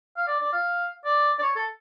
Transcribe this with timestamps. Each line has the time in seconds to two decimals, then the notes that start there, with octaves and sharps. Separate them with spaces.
0.17 F5
0.27 D5
0.41 D5
0.53 F5
1.05 D5
1.39 D5
1.42 C#5
1.56 A4